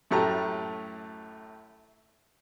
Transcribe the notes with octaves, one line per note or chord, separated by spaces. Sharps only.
F#2 A2 A3 G4 A#5